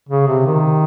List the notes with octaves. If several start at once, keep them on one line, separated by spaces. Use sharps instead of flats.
C#3
C3
D#3